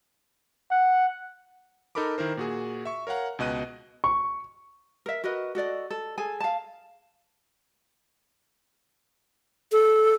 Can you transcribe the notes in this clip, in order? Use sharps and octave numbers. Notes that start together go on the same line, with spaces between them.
F#5
D#4 A4 A#4 B5 D6
D#3 E4 A#4 C5
A#2 F#4 G#4
E5 C#6
A#4 C#5 F5 F#5 A#5
C#2 B2 D#5 F#6 D#7
C#6
A#4 E5
F#4 A#4 B4 D#5
F#4 A4 D5 D#5
A4
G#4 A4 G#5
F5 A5
A4